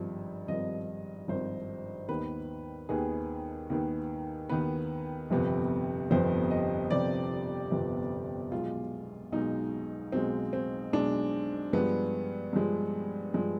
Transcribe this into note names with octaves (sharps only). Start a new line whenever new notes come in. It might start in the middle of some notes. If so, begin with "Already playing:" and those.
Already playing: G#1 G2 F3
G#1 G2 F3 D#5
G#1 G2 F3 C5
D#2 D#3 B3 B4
D#2 D#3 B3 G#4
D#2 D#3 B3
D#2 D#3 B3 B4
G1 F2 C3 F3 B3
G1 F2 C3 F3 B3 C5
D#5
G1 F2 C3 F3 B3 D5
G1 F2 C3 F3 B3
B1 B2 G#3 F4
B1 B2 G#3 D#4
B1 B2 G#3 C4
C4
B1 B2 G#3 D4
G2 F3 G#3 B3
G2 F3 G#3
G2 F3 G#3